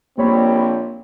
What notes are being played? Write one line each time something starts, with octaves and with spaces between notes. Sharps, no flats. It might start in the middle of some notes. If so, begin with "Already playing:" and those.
A#1 G3 A#3 C4 C#5 B5